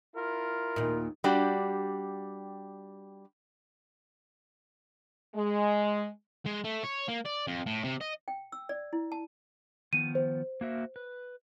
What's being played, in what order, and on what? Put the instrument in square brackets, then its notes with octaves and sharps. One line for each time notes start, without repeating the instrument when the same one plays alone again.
[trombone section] E4 F4 A#4
[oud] D#2 A#2
[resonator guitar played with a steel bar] G3 D4 F#4 G4
[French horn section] G#3
[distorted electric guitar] G#3
A3
C#5
A#3
D5
F2
A2
C3
D#5
[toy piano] G5
E6
D5
E4
A5
[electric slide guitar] D#3 F3 B3 [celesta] D#7
[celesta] C5
[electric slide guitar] A#3 F#4 E5
B4